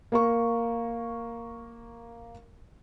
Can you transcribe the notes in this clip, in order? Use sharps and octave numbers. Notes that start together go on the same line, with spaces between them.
A#3 A#4 C#6